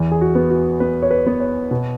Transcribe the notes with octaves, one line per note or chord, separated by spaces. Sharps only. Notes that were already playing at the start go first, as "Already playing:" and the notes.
Already playing: E2
G#4
F#4
B3
F#4
B3 B4
C#5
B4
B3
C#5
B2